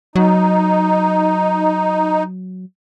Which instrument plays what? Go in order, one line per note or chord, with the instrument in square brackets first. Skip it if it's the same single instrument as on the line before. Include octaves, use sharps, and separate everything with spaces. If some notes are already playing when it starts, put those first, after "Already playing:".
[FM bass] F#3 [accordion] D#4